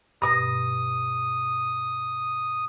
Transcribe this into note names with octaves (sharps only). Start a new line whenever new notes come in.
G2 B2 D#6 A#6